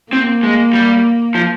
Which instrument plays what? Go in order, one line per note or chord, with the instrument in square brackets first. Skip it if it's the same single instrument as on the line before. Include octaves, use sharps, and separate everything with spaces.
[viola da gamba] A#3 [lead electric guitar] C4
[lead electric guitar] G#3
G3
F3